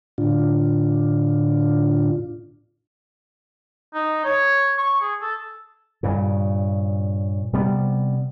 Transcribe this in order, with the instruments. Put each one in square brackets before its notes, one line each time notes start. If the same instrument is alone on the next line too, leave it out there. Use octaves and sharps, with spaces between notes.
[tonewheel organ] A2 D3 D4 F4
[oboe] D#4
C#5
C#6
G#4
A4
[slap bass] G2 A#2 C#3
C3 G3 B3